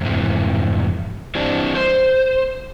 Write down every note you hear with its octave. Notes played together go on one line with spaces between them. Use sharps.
F2 G#2 C3 E3
E3 G3 C4 D4
C5